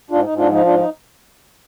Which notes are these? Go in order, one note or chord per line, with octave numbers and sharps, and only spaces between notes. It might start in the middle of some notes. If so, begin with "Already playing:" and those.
G#2 D4 F4
G#2 D#4
D4 F4
F3 D#4
G#2 D4 F4
D#4